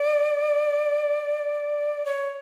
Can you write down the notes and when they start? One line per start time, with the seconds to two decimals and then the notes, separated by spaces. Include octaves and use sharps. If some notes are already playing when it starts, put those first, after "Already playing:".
Already playing: D5
2.05 C#5